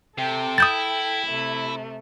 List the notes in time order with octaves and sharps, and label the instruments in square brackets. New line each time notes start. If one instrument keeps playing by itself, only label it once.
[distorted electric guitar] C3 [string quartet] A4 G5
[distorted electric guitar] E4 [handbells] D#6 G6 A6
[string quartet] C3 A3